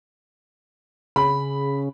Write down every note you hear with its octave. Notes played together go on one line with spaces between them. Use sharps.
C#3 B5